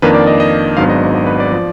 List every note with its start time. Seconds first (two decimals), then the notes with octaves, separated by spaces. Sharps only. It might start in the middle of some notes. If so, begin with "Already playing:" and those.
0.02 F2 D#3 A#3 D4 B4
0.14 D5
0.27 D#5
0.40 D#5
0.77 G#1 G#2 F#3 B3 D4 F5
0.89 D#5
1.15 D#5
1.27 B4
1.40 D5
1.52 F3